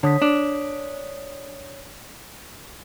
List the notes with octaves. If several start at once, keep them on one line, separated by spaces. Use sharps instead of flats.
D3 C#5 D#6 B6
D4